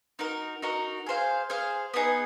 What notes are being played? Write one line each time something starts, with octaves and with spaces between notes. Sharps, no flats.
D#4 F#4 A#4
D#4 F#4 A#4
G#4 C5 F5
G#4 C5 F5
B3 D#4 G#4